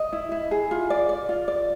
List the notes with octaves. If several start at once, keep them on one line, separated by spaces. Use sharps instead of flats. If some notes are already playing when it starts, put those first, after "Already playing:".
Already playing: D#5
E4
E4
G#4
F4
D5
D5
F4
D5